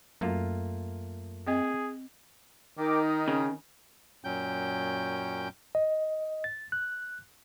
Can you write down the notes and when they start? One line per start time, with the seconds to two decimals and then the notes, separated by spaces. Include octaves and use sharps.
0.21 F#2 A3 A#3 F4
1.47 C4 G#4 D#5
2.78 D#3 D#4 A#4 G5 D6
3.07 D#6
3.28 C#3
4.25 F#2 A#2 F#3 C#4 G5 G6
5.75 D#5
6.44 A6
6.72 F#6